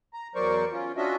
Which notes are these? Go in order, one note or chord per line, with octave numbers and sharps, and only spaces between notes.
A#5
E2 F#3 A#4 C5 D5 C#6
C#4 F4
C#4 D4 F4 F#4 D#5 E5